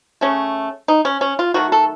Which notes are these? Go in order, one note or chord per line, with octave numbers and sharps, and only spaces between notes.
C#3 A3 C#4
D#4
C#4
C#4
F4
D#3 F#3 A3 F#4
A4